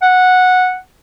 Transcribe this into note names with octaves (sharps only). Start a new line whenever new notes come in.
F#5